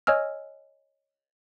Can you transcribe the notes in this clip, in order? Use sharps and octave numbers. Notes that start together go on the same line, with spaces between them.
C#5 D#5 G#5 E6 F6